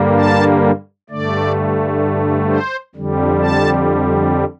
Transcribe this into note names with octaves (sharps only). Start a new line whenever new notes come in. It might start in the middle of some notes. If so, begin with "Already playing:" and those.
Already playing: G2 D3 G3 A#3
A5
G2 D3 A3 D5
C5
F2 D3 G3
A5